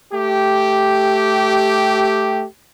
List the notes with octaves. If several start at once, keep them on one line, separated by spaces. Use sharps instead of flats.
A3 G4